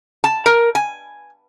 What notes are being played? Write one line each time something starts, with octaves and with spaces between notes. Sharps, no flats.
A5
A#4
G#5